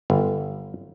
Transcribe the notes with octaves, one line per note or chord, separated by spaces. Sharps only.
G1